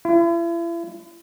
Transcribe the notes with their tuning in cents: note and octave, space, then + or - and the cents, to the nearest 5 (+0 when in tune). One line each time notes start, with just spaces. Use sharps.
E4 +40